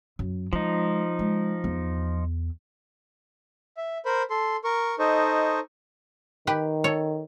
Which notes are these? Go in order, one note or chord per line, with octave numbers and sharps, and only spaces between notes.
F#2
F3 G#3 D#4
G#3
E2
E5
A#4 C5 B5
A4 C6
A#4 C#6
D#4 A4 C5 D#5 C#6
D#3 G4 B4 G5
A4 C#5